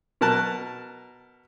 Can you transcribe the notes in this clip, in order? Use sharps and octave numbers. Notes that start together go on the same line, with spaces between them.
B2 A#4 A5 F#6